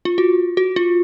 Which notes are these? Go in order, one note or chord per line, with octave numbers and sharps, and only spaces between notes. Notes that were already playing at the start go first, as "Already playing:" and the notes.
F4
F#4
F#4
F4